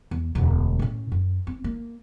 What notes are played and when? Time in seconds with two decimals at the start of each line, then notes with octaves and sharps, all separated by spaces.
0.11 E2
0.35 E1 D2
0.79 A2 C#4
1.12 F#2
1.47 C4
1.64 A#3